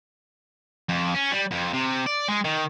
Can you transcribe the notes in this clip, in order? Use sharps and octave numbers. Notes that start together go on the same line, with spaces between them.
F2
C#4
G3
F2
C3
D5
G#3
D#3